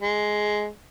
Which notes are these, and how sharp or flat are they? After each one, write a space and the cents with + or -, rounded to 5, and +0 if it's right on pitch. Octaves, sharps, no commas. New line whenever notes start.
G#3 +10